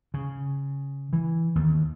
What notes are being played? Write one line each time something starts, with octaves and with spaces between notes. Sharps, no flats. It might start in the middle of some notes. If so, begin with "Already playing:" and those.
C#3
E3
D#2